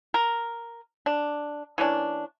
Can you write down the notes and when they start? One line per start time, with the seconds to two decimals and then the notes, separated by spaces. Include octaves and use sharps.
0.14 A#4
1.06 D4
1.78 E3 A#3 C#4 D4